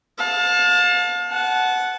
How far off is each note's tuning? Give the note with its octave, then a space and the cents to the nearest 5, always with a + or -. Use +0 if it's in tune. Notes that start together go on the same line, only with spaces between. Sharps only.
F5 +40 A5 +0
F#5 +0 A5 -25